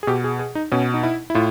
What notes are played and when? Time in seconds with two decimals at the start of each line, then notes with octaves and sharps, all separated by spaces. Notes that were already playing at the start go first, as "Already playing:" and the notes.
0.03 G#4
0.07 B2 G4
0.24 G#4
0.39 G#4
0.55 D#4
0.72 B2 C#4
0.94 D#4
1.03 E4
1.30 E4
1.35 A2 F4